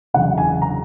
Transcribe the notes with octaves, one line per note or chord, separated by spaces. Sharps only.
F#1 E2 C#3 F#3 F#5
G#5
A#5